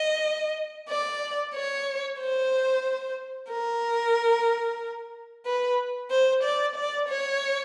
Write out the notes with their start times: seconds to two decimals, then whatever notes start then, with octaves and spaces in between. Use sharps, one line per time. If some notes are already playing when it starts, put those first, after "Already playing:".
Already playing: D#5
0.89 D5
1.54 C#5
2.19 C5
3.50 A#4
5.46 B4
6.11 C5
6.43 D5
6.76 D5
7.08 C#5